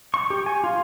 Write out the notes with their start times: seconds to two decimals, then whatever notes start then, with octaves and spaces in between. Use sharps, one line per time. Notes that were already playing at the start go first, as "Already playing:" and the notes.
0.14 C#6
0.30 G4
0.46 G#5
0.64 F4